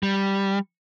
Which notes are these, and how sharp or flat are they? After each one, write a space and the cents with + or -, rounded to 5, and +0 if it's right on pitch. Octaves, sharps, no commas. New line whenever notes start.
G3 +0